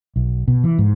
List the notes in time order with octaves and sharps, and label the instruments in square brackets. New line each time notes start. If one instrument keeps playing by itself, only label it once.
[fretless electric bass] B1
B2
E3
G#2